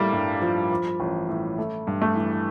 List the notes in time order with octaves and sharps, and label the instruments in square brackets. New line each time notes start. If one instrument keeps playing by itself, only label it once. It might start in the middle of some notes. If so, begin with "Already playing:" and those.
Already playing: [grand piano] A2 A3 [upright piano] G3 A#3
[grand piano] G2
F3
F3
A1
A2
A3
G2
[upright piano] A3
[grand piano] E3